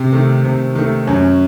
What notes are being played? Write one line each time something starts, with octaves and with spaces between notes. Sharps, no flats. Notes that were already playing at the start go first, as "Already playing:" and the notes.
Already playing: C3 C4
D#3 A3
C3
D#3 A3
F#2 C#4